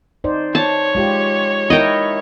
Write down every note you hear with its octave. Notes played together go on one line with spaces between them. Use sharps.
D#4 C5 D5
C#5 A5
G#3 F4 G4
D#4 E4 A#4 D#5 G5